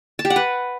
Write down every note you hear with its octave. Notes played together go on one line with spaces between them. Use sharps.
A5
G4
F#5
B4